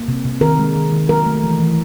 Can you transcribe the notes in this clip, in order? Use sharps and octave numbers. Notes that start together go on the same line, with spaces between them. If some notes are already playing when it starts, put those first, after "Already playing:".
Already playing: A#3
C3
C3
D#3 A#4
G#3
D#3
D#3
F#3 A#4
A3
E3
E3